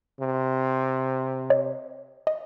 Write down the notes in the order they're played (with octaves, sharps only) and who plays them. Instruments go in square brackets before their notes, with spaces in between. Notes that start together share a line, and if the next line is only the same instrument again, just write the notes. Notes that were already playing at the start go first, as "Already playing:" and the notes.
[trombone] C3
[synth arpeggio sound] C#5 D#5
D#5